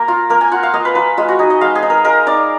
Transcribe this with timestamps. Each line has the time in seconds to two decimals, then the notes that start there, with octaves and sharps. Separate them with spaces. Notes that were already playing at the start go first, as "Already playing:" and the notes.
Already playing: A#3 A#4
0.08 F4
0.30 A#3 A#4
0.41 G#5
0.52 F4 F#5
0.63 F5
0.74 A#3 D#5
0.85 B4
0.95 F4 B4
1.17 G#3 F4
1.29 F#4
1.39 D#4 G#4
1.50 D#5
1.61 G#3 F5
1.75 G#4
1.83 D#4
1.90 A#4
2.04 G#3 A#4
2.27 D#4 D5